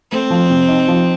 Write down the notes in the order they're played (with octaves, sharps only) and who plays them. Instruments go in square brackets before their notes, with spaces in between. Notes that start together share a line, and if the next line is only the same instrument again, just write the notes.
[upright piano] A3 [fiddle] C4
[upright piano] F3
C3
D#4
F3